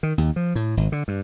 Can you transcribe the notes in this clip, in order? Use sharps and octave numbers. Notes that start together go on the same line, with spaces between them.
D#3
D#2
F3
A2
G#1
D3
G2